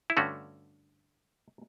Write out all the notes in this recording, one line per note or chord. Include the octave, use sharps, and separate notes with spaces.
E4
G2 D3 A3 C#4 F#4